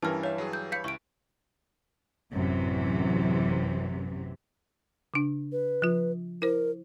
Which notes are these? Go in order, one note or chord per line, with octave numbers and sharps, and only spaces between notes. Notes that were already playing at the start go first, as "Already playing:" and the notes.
G2 E3 C#4 A#4 A5 F6
C#5 E5 F5
F#3 G#4
G6
C#5 F5 B5 G6 B6 C#7
C#2 E4 C#6 D7
A1 F#2 C3 E3
C#3 D4
B4
F3 F4
E4 A#4 C5